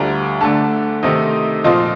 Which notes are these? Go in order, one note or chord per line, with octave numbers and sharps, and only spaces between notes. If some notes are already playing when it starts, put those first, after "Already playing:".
Already playing: D2 D3 G3 D4 F4 A#5
D3 A3 D4 A5
C3 D#3 A3 C4 D#4
A#2 F3 C4 F4 D#5